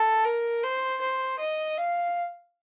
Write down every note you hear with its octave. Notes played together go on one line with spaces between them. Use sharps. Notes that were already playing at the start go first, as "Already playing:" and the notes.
Already playing: A4
A#4
C5
C5
D#5
F5